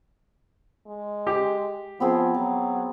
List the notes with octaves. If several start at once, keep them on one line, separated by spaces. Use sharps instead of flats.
G#3
G4
F3 B3 C4 G#4
F#3